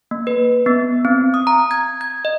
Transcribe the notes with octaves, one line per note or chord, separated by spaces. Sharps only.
A#3
B4
B3
C4
D#6
A#5
G#6
G#6
D#5